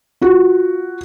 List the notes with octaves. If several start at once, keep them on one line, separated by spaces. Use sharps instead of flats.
F4 F#4